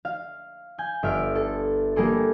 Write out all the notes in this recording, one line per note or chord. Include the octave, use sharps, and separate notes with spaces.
F5
G#5 G6
G1 E5 F6 D7
A4
G3 A#3 G#4 A4